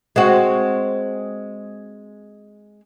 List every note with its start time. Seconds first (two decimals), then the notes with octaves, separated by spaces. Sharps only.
0.16 G#3 C4 F#4